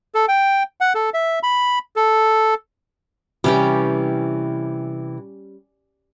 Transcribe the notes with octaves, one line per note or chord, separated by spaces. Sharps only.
A4
G5
F#5
A4
E5
B5
A4
C3 E3 G3 C#4 G4